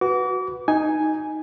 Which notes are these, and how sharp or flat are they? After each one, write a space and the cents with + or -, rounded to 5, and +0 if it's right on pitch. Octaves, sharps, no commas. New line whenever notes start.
F#4 +0 B4 +0 D6 -35
D#4 +0 G#5 +0